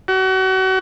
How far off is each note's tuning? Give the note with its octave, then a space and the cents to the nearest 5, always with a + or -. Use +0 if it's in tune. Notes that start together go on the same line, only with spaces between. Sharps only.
F#4 +35